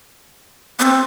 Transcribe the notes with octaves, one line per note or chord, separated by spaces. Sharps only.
B3
C4